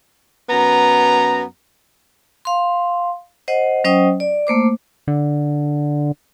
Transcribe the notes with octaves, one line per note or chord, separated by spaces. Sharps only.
F#2 B3 A#5
F5 C6
C5 D#5 F#5
F#3 C#4 C5 D#5 G5 D#6
D5
A3 A#3 C5 D6
D3